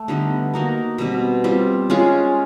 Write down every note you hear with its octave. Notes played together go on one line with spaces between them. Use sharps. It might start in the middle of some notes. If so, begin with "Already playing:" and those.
Already playing: A3
D3 G3 B3 D#4
A#3 D#4 F#4 A#4
B2 G3 C4
G3 C4 F4
G#3 C#4 F4